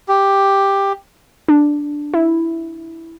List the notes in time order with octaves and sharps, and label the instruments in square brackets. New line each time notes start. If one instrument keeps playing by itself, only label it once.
[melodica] G4
[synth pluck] D4
E4